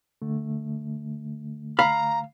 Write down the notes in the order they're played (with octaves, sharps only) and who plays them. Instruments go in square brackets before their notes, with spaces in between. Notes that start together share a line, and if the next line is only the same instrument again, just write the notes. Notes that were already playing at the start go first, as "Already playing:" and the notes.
[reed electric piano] D3 A3
[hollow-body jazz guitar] F5 B5 [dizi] A#5